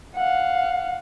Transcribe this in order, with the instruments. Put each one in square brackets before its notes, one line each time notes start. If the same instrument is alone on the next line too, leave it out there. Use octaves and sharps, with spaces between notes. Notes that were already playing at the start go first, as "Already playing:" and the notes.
[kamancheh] F5 F#5